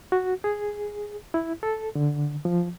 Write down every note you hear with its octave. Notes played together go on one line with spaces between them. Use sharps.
F#4
G#4
E4
A4
D3
F3